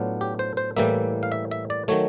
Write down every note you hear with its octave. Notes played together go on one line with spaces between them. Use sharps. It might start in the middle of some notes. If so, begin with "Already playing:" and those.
Already playing: A2 F#3 B3 D4 F4
G4
C5
C5
A2 E3 G3 A#3 E5
F5
E5
E5
D5
D#3 F#3 A3 C#5